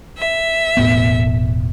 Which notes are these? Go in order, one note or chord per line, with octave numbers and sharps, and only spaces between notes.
E5
E1 A2 B3